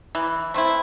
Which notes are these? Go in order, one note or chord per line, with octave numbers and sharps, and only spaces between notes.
E3
A3 C4 E4